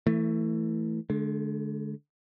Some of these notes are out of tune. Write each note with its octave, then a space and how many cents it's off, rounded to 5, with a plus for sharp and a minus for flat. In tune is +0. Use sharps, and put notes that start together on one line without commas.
E3 +0 A3 +20
D3 +0 G#3 +40